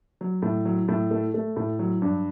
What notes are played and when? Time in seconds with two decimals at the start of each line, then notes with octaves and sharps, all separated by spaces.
0.21 F#3
0.42 A2
0.65 F#3
0.88 A2
1.11 A3
1.34 A3
1.56 A2
1.79 F#3
2.02 G2